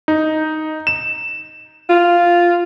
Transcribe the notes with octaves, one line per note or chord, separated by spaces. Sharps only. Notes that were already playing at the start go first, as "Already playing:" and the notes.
D#4
E7
F4